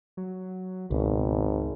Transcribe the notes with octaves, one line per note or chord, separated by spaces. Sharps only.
F#3
G#1 C#2 B2